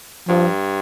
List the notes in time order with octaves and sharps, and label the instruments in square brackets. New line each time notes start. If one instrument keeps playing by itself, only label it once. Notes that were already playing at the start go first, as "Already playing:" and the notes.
[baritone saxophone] G2 [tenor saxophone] F3